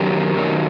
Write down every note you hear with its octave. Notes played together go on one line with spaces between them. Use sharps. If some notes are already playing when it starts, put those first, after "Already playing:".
Already playing: F#2 D#3 F#3 G4 A#4
F#2 D#3 F#3